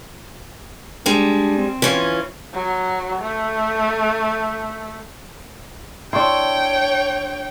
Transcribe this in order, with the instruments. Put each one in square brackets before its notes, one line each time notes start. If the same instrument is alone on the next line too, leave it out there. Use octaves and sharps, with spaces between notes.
[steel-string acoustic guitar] G3 G#3 [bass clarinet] D4
[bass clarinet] C4
[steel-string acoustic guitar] E3 C#4 F4
[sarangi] F#3
A3
[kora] D4 E4 [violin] C#5 G5 [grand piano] C6 C#6